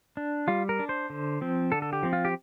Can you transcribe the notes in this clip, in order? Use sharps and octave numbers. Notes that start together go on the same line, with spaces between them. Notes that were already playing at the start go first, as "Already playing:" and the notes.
D4
G3 F4
A#4
D4
C5
D3
F3 C4
D3 A4
A4
G4
F3 C4
F4
G4